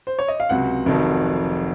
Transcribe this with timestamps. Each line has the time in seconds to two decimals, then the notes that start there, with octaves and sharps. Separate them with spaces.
0.07 C5
0.19 C#5
0.28 D#5
0.40 F5
0.49 C#2 C3 F#3 F#5
0.86 F1 F2 D#3 F#3